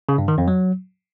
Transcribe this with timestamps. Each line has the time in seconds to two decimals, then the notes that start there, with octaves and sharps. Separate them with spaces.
0.09 C#3
0.18 G2
0.28 D#3
0.38 F2
0.48 F#3